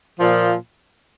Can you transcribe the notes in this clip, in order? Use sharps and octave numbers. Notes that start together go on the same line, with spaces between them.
A#2 F3